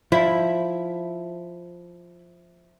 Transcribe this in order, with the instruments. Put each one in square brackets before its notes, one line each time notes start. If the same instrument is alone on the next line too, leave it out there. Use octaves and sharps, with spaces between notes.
[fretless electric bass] F3 [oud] E4